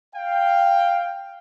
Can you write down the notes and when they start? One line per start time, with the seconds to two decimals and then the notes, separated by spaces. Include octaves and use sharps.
0.15 F5 G5